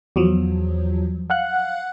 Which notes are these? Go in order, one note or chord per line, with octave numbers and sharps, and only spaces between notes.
E2 F3 F#3
F5 F#5 F#6